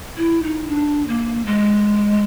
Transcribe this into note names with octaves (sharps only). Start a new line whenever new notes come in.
E4
D#4
D4
A#3
G#3